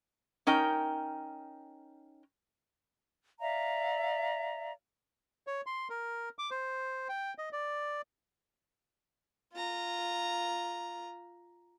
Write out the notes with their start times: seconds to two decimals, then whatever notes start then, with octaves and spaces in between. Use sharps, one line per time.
0.47 C#4 D#4 A#4 G5
3.40 D5 E5 F5 A#5
5.47 C#5
5.66 C6
5.90 A#4
6.39 D6
6.51 C5
7.09 G5
7.38 D#5
7.52 D5
9.53 F4 A#5